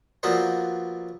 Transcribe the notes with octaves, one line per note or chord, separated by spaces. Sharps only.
F3 F#3 A#3 B3 D4 C5